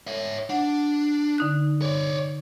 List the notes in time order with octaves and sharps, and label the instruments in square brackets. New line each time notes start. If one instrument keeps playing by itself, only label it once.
[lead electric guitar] C#5 E5
[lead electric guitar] D4 [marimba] F#5
[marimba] D3 D#4 F#6
[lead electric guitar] C#5 D5